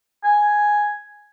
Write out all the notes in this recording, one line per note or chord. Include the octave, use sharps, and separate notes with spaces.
G#5